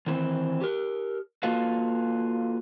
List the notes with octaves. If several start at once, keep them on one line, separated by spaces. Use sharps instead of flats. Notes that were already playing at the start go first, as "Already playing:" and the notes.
D#3 E3 C4 E4
G4 A#4
A#3 F4 F#4 A4 B4 F5